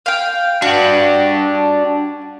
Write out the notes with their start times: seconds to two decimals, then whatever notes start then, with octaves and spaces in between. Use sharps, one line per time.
0.06 F5 G5
0.62 D4 F#4 G4